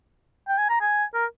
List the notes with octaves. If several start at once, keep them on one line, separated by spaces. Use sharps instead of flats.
G5
G#5
A#5
G#5
A#4